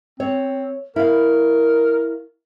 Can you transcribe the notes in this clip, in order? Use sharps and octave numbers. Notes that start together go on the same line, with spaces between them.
C4 C#5
E4 A#4 F5